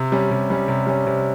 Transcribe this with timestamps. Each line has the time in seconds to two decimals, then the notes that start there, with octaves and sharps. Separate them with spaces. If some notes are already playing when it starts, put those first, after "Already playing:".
Already playing: C3
0.12 G3 C#4
0.31 C3
0.50 G3 C#4
0.68 C3
0.87 G3 C#4
1.07 C3